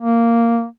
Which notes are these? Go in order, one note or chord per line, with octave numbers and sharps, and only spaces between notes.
A#3